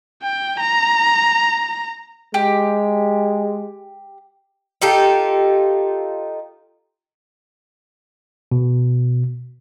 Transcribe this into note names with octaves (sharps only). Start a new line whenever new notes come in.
G5
A#5
G#3 G4
D#4 F4 G4 A4
B2